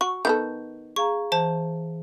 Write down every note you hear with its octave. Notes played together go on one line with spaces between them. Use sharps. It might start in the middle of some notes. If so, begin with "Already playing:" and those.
F#4 C#6
D#3 B3 A4 G6
G#4 F5 A#5 C#6
E3 C5 A5